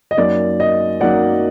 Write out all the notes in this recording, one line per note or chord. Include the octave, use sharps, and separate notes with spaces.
D#5
F#2 F#3 A#3 D#4 D5
D#5
F#2 F#3 A#3 D#4 D5 F#5